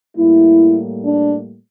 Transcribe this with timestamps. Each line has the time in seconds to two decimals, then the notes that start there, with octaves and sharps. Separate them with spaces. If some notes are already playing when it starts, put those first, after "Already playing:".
0.16 A2 G3 A#3 E4
1.04 D4